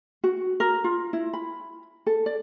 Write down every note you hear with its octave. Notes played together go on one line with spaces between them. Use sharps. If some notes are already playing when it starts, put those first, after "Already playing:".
F#4
A#4
F4
E4
B5
A4
D5